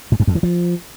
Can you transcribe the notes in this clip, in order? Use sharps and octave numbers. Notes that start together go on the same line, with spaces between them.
G#2
F#2
F2
E3
F3